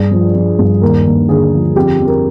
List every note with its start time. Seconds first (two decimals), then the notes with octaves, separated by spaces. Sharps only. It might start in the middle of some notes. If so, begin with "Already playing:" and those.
Already playing: G2 G#4
0.11 F3
0.35 F3
0.59 G2
0.82 D#2 A#4
1.06 D#2
1.29 D3 G#4
1.53 F3
1.76 F2 G4
1.99 F2
2.07 A#4